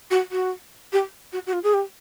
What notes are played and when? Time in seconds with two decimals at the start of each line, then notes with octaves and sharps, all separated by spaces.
0.10 F#4
0.31 F#4
0.92 G4
1.32 F#4
1.46 F#4
1.53 F4
1.63 G#4
1.73 G4